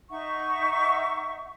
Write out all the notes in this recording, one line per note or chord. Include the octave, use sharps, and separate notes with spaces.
D#4 E5 F#5 C#6